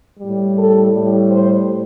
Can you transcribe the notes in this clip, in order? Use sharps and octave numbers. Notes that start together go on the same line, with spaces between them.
A2 G3
A4
A2 G3
C5